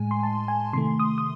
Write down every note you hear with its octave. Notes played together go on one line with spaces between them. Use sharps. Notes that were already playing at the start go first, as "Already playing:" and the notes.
Already playing: A2 G#3 G#5
C6
A5
G#5
C3 D#3 A3 C6
D#6
D#6